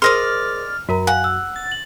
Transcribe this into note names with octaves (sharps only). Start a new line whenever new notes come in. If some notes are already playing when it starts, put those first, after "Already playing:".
G#4 A#4 C5 D5 D#5 C6 F6
F#2 F#4 A#4 A#5
F5 F#5 G#5
E6
A6
F#7